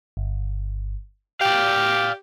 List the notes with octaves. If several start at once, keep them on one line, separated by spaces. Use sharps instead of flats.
G1
G4 D5 F5 G5